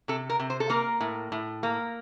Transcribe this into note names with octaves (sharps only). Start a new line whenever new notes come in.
C3 A4
A#4
C3
C5
A4
A#3 A#4
A2
A2
A#3